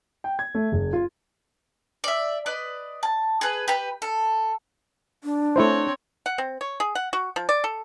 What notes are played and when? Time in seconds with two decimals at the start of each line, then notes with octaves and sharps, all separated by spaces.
0.24 G5
0.39 G#6
0.55 A3
0.72 F#1
0.93 F4
2.04 D5 E5
2.46 B4 D5 D#5
3.03 A5
3.41 G#4 B4
3.68 G4 B4 B5
4.02 A4
5.24 D4
5.56 A3 C4 E4 C5 C#5
6.26 F#5
6.38 C4
6.61 C#5
6.80 G#4
6.95 F#5
7.13 F#4
7.36 F3
7.49 D5
7.64 A4